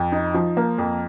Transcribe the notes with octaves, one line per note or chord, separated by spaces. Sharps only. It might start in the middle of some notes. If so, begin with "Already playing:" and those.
Already playing: F2
D#4
F3
A#3
F2